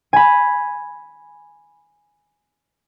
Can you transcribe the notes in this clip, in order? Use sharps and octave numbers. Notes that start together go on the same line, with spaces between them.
G#5 B5